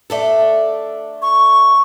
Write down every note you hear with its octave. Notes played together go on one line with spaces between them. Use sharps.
A3 D4 A4
C#6